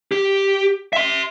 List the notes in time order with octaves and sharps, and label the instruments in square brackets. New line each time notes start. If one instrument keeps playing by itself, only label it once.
[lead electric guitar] G4
E5 C6